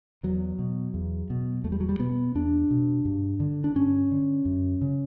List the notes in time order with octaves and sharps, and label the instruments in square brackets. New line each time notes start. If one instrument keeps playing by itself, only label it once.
[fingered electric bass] E2 F#3
B2
E2
B2
E2 A3
G3
F#3
G3
B2 B3
E2 D4
B2
G2
D3
D4
G2 C#4
D3
F#2
C#3